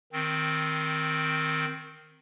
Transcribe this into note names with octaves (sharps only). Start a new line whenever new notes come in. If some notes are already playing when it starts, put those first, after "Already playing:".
D#3 C4